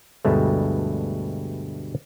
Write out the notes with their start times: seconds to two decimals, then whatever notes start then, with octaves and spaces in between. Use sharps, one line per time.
0.25 D2 G2 B2 G#3 A3